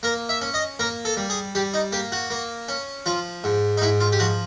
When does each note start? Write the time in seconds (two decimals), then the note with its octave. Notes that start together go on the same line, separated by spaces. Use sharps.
0.03 A#3 A#4
0.29 E5
0.42 C#4
0.54 D#5
0.79 A#3 A#4
1.05 A4
1.17 G3
1.30 G#4
1.55 G3 G4
1.74 D#4
1.92 A#3 G4
2.12 F#4
2.30 A#3
2.68 C#4
3.06 F3 F4
3.44 G#2
3.78 D#4
3.82 G#2 E4
4.00 F4
4.12 G4
4.19 F3 F#4